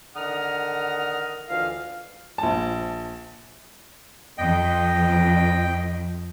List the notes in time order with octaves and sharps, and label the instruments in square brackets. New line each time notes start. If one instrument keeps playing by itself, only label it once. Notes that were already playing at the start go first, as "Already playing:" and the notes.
[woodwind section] D3 D#3 F#5 A#5 D#6 F6
D2 E3 F4 D#5 F5
[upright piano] A#1 A5
[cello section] F2 [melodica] D#5 G5